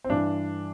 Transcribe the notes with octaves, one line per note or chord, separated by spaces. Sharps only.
C4
G2 E3 D4